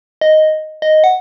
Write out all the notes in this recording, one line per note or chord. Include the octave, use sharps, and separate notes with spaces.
D#5
D#5
F#5